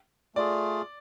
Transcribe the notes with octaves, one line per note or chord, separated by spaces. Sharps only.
A3 F4 G#4 D5